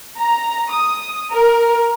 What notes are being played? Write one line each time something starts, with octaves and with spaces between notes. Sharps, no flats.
A#5
D#6
A#4